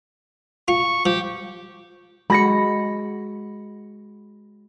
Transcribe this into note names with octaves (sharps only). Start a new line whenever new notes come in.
F4 C#6
F3 G4
G#3 F#4 B5 A#6 C#7